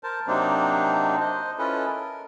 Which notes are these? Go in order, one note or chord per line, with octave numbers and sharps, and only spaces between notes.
A#4 C5 A5
C3 F#3 A#3 C4 D4 D#4
C5 D#5
C#4 E4 F4 A4 B4 D#5
A#4